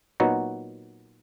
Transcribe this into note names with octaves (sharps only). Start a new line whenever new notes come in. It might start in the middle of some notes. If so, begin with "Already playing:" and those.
A#2 F#3 B3 D#4 F#4